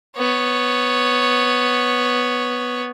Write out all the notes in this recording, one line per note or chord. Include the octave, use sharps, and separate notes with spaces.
B3 C#5